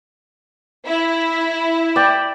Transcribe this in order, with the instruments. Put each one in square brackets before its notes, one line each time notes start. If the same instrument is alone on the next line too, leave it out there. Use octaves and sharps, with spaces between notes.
[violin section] E4
[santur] D5 G5